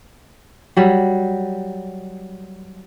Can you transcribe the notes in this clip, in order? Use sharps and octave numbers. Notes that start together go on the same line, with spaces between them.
F#3 G3